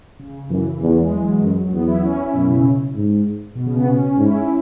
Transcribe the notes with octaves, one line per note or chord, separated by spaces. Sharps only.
C#3
F#2 E3
E2
G#3
F#3
F#2
E2 B3
E4
C#4
E4
C#4
F#2 B2
C#3
G#2
B2
C#3
B3
B2 C#4
C#4
G#2
E4
C#4
E4